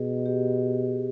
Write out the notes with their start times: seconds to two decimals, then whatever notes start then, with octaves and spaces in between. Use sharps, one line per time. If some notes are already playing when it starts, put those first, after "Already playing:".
Already playing: B2 G#4
0.26 G4